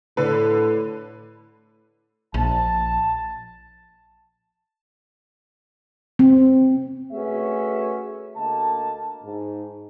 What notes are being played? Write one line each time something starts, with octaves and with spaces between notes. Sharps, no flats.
A2 D3 B4
A#1 A5
C4
A3 C#4 F#4 G#4 B4 E5
D2 A#3 D#5 A5
G#2